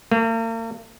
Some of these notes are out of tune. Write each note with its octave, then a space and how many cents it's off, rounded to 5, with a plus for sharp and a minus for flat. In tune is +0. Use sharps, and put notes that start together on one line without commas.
A#3 -45